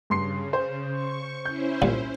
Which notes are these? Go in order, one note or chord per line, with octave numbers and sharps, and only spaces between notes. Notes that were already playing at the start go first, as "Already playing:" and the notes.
G2 C#3 C6 C7
C5
C#6
C#4 E4 C5 G6
C2 A#2